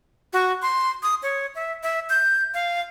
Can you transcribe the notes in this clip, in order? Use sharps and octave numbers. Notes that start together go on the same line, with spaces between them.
F#4
C6
D#6
C#5
E5
E5
G6
F5